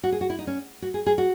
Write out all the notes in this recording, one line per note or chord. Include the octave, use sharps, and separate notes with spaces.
F#4
G#4
F#4
E4
D#4
C#4
F#4
G#4
G#4
F#4